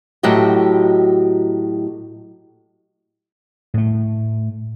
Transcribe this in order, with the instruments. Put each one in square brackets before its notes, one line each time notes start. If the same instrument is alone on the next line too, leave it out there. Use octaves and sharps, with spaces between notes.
[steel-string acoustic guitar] A2 F#3 F#4 G4 D#5
[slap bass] A2 A3